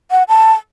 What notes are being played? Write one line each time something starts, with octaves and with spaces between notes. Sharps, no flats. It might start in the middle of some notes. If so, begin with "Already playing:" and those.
F#5
A5